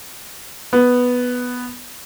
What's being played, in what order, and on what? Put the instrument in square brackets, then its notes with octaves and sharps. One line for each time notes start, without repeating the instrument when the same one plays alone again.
[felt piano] B3